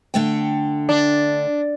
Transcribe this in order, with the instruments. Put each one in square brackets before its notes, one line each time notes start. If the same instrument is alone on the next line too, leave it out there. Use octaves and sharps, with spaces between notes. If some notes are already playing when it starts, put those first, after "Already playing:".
[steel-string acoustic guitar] D3 A3 G5
[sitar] D4